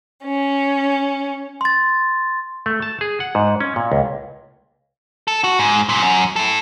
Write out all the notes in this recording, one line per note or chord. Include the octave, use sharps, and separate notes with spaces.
C#4
C6 A6
A3
A5
G#4
F#5
G#2
C#4
A#2
C#2
A4
F#4
G#2
F#2 A#2
F#2
E4 A4